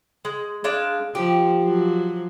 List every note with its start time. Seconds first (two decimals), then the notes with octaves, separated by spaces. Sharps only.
0.25 G#3
0.64 G#3 D4 F5
1.15 F3 G4
1.61 F3 F#3